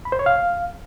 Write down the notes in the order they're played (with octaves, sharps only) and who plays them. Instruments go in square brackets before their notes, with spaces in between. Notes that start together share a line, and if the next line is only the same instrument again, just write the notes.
[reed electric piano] B5
C5
C#5
F5